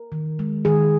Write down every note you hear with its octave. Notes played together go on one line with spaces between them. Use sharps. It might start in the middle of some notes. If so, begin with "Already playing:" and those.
Already playing: A#4
D#3
G#3
D#3 G#4